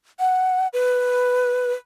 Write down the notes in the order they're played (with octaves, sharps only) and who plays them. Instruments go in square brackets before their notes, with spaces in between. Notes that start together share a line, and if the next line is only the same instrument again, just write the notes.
[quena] F#5
B4